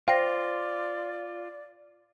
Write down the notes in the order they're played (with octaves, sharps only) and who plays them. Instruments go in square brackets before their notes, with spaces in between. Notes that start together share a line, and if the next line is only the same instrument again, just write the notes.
[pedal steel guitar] F4 [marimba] C5 A#6 [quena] D5 [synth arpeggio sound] F5 G5